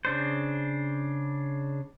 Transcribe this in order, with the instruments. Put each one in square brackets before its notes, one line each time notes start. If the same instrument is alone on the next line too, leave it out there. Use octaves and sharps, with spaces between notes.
[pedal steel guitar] C#3 D4 C5